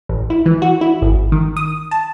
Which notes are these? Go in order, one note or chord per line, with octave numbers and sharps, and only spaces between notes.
A1
E4
E3
F#4
E4
G#1
D#3
D#6
A5